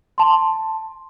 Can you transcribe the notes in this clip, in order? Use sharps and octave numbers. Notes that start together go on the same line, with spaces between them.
A5 C6